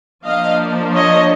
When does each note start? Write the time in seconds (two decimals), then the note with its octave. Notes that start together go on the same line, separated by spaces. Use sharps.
0.25 F3 A#3 D4 D#5 F5
0.94 C#5 D#5